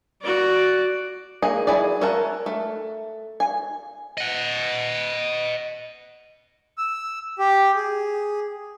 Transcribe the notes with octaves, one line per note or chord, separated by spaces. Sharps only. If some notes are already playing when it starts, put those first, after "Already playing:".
F#4 D5
A#3 G#4 D#5
F#3 E4 G#4 D5
C#4 A#4 E5 F#5 A5
A3
G#5
D#5 F#5
E6
G4
G#4